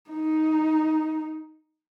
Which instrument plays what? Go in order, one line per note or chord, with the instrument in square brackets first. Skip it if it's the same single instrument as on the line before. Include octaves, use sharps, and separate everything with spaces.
[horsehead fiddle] D#4